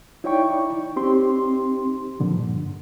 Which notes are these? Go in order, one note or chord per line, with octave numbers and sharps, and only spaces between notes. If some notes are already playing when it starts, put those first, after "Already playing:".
D#4 E4 C#5 D5 G5 C#6
C4 D#4 G4 C6
A#2 D3 F3
G2